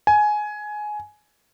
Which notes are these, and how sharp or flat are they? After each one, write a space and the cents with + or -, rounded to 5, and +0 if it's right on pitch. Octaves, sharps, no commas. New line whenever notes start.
G#5 +15